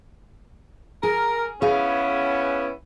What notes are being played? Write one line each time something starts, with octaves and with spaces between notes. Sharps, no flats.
G#4 A#4
B3 C#4 E4 G#4 F5